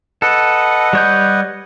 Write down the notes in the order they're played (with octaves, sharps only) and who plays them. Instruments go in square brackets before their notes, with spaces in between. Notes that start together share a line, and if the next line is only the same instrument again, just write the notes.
[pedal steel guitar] A4 [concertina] B4 D#5 F#5
[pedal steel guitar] G3 C#5 G6